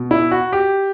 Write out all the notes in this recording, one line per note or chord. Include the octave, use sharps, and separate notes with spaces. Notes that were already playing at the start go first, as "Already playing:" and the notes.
Already playing: B2
E4
F#4
G4